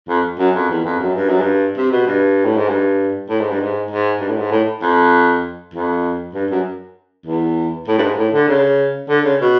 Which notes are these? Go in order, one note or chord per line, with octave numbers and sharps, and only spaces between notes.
F2
F#2
F2
E2
F2
F#2
G2
F#2
G2
C3
B2
G2
A2
G#2
G2
A2
G#2
G2
G#2
G#2
G2
A2
G#2
A2
F2
F2
G2
F#2
E2
A2
G2
G#2
A2
D3
C#3
D3
C#3
B2